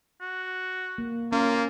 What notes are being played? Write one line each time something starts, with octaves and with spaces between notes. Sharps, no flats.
F#4
A#3
A#3 C#4 F4